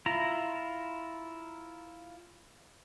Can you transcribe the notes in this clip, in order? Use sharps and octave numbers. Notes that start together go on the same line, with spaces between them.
E4 F4 A#5